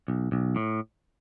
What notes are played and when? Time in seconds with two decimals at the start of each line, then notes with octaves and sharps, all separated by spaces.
0.08 B1
0.32 B1
0.56 A2